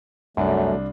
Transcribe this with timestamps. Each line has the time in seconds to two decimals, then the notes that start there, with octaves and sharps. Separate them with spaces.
0.37 C2 F#2 F#3 A3 D4